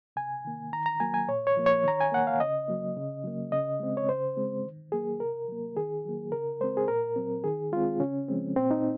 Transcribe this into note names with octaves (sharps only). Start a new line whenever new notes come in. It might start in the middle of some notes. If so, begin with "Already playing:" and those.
C3 G#5
D#3 A#3
D#3 A#5
A#5
F#3 A#3 G#5
G#5
A#2 C#5
C#5
F3 A#3
C#5
D#3 A#5
G#5
A#3 F#5
F5
C#3 D#5
F#3 A#3
C#3
F#3 A#3
C#3 D#5
G#3 C4
C#5
C#3 C5
G#3 C4
D#3
F#3 A#3 G#4
C3 A#4
F#3 A#3
D#3 G#4
F#3 A#3
C#3 A#4
G#3 C4 C5
G#4
A#2 A#4
F#3 C4
D#3 G#4
G#3 C4 F4
C#3 C#4
F3 G#3 C4
A#2 C4
D#4